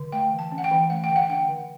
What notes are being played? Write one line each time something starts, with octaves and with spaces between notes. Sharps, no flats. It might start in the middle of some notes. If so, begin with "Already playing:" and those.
Already playing: D3
A3 G5
E3
A5
C#4
F#5
G5
E3
A3 F#5
G5
D3
F#5
D4 G5
F#5
D3